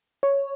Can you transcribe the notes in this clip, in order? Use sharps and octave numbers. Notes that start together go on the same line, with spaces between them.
C#5